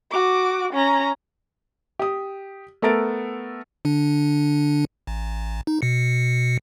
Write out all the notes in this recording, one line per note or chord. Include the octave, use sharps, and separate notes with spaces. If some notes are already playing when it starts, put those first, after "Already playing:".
F#4 D6
C#4 A#5
G4 D#6
A3 B3 A4 A#4 A6 D7
D3 D4
A1
D#4
B2 C#7